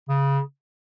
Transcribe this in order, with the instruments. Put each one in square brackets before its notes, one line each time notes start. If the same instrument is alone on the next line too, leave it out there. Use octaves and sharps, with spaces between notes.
[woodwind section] C#3